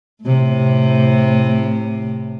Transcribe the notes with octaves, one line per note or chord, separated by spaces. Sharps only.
A2 C3